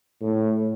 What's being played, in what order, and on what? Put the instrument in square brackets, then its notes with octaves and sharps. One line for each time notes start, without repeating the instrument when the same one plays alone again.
[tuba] A2